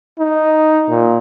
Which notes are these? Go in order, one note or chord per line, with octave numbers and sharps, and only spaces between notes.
D#4
A#2